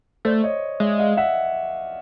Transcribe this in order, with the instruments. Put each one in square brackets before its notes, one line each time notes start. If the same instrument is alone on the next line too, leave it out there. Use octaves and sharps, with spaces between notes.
[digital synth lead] A3 [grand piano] C5 D5
[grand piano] C#5 D#5
[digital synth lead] G#3 [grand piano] D5 E5
[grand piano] D#5 F5
E5 F#5